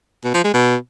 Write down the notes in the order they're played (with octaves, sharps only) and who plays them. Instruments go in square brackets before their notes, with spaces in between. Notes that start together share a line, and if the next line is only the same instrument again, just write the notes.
[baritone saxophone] B2
F3
G#3
B2